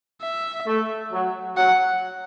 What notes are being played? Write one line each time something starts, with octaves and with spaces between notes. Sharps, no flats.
E5
A3
F#3
F#3 F#5